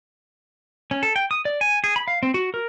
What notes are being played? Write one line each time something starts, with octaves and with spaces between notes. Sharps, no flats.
C#4
A4
G5
D#6
D5
G#5
G#4
B5
F5
C4
F#4
A#4